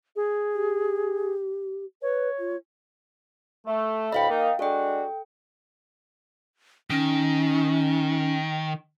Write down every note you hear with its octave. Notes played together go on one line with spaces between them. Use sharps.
G#4
G4
B4 C#5
F4
A3
D2 A2 D#5 F5 G5 B5
A#3 D#4
G#3 D4 F#4 A4 G5
D#3 C#4